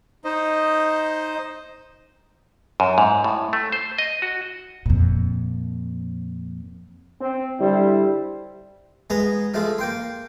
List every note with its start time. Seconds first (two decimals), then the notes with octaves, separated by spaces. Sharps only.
0.25 D#4 C5 D#5
2.80 F#2
2.98 G#2
3.24 A2
3.53 A3
3.72 C5
3.98 D#5
4.22 F#4
4.86 F2 A#2
7.20 C4
7.60 D3 G3 E4 C5
9.10 G#3 B3 A#5 D#6
9.54 F3 G#3 A3 F4
9.78 A#3 G5 C6